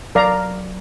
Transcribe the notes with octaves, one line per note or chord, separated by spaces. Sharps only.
F#3 A#4 D5 F5 A#5